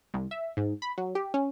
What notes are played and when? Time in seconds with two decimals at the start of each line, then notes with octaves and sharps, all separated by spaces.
0.14 C2
0.31 E5
0.57 G#2
0.82 B5
0.98 F#3
1.15 G4
1.34 C#4